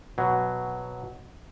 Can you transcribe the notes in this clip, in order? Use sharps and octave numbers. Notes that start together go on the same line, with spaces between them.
B2 F#3